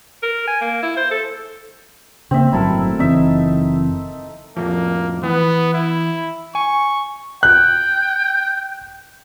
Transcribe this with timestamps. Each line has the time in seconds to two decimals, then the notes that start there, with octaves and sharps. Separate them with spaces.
0.23 A#4
0.48 G#5
0.61 A#3
0.83 E4
0.97 C5
1.11 A4
2.31 C#3 A#3 C4 E5
2.52 G1 A2 F#3 E4 A4 A#4
2.99 F#1 E3 C4 D#4 E5
4.57 F2 A2 F3 A#3
5.23 E3 B3
5.74 E4
6.55 G#5 C#6
7.43 G5 F#6